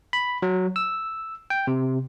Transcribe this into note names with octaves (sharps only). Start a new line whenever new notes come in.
B5
F#3
E6
G5
C3